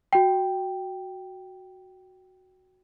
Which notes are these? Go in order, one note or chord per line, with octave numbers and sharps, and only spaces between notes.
F#4 G5